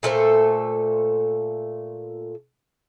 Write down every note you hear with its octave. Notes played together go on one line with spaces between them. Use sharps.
A#2 A3 A4 C5